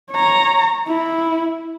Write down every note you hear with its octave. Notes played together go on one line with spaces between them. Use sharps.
C#5 A#5
E4